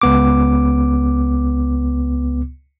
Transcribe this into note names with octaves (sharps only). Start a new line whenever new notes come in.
C#2 B3 D6